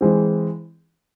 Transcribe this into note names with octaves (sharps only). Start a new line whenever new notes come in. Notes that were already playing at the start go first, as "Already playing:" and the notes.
E3 G#3 C4